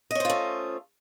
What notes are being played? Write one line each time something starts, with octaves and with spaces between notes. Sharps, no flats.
A3 C#4 F4 C5 D#5